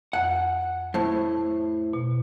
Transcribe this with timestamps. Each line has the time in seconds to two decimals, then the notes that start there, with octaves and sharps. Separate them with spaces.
0.13 F2 F#5
0.94 A2 A3 C5
1.93 B2